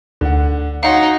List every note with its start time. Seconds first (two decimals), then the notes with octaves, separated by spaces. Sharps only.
0.21 D2 D3 F#5
0.83 D#4 F#4 C#5 F5 F#5 C6